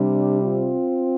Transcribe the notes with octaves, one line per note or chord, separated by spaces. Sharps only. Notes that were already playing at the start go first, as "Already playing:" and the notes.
Already playing: C3 G3 D4
C4 F4